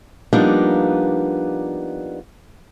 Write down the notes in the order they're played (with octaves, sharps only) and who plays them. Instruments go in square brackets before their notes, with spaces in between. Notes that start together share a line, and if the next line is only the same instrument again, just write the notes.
[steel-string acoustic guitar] F3 G3 A#3 B3 D4 D#4